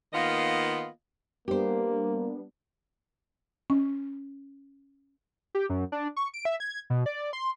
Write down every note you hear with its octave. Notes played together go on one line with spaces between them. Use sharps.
D#3 A#3 B3 F4 D#5 F5
G3 A#3 B3 D4 G4 C5
C#4
G4
F#2
D4
C#6
D7
E5
G#6
B2
D5
C6